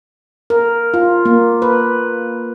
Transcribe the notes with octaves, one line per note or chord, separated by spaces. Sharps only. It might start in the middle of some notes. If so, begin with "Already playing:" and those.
A#4
F4
A#3
B4